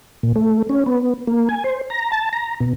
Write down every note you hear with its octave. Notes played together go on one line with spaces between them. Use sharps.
A#2
A3
C#4
B3
A#3
G#5
C5
A#5
A5
A#5
B2